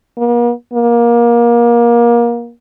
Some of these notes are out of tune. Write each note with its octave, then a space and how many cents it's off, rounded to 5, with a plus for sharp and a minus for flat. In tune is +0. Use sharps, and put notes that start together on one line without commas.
A#3 +45
A#3 +25